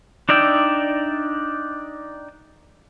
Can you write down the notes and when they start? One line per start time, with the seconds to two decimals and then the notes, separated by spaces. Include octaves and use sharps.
0.29 D4 D#4 D5 E5 G5